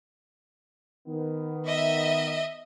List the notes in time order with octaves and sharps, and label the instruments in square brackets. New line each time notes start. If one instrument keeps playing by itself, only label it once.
[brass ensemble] D#3 B3
[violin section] D#5 E5